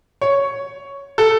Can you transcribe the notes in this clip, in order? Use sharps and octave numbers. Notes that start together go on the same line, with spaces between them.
C#5
A4